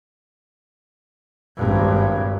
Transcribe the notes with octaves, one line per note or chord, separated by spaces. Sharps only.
G#1 G2